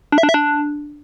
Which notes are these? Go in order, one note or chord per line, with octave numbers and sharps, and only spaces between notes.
D4
E5
D4
E5
D4